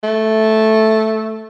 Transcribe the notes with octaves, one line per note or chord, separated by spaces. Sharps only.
A3